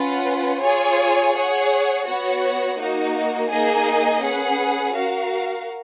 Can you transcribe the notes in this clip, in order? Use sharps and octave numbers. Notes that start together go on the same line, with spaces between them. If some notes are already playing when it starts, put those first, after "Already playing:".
Already playing: C#4 F4 B4 F#5
F4 G#4 C#5 G#5
G#4 C#5 F#5
B3 F#4 C#5 F#5
A#3 D#4 F#4
A#3 D#4 G#4 D#5 G#5
C#4 G#4 B4 F#5
F#4 A#4 F5